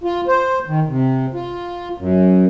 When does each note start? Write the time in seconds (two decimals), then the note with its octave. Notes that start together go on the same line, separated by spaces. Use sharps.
0.04 F4
0.27 C5
0.67 D#3
0.88 C3
1.34 F4
1.98 F#2